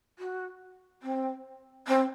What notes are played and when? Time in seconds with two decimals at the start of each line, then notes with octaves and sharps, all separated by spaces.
0.19 F#4
1.02 C4
1.87 C4